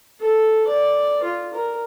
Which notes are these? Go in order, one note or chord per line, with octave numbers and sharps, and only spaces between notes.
A4
D5
F4
A#4